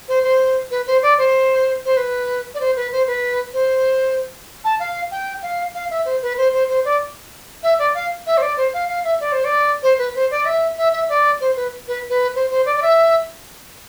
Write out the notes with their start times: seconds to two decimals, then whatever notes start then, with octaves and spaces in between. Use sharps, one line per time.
0.08 C5
0.23 C5
0.70 B4
0.86 C5
1.02 D5
1.18 C5
1.85 C5
1.97 B4
2.54 D5
2.60 C5
2.76 B4
2.92 C5
3.07 B4
3.53 C5
4.64 A5
4.79 F5
5.11 G5
5.42 F5
5.74 F5
5.90 E5
6.05 C5
6.22 B4
6.37 C5
6.53 C5
6.69 C5
6.85 D5
7.63 E5
7.79 D5
7.94 F5
8.26 E5
8.37 C5
8.42 D5
8.57 C5
8.73 F5
8.88 F5
9.04 E5
9.20 D5
9.32 C5
9.44 D5
9.82 C5
9.98 B4
10.15 C5
10.31 D5
10.45 E5
10.77 E5
10.93 E5
11.09 D5
11.40 C5
11.56 B4
11.87 B4
12.09 B4
12.35 C5
12.50 C5
12.65 D5
12.76 D5
12.82 E5